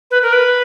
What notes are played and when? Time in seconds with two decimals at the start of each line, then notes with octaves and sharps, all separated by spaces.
0.11 B4
0.22 A#4
0.33 B4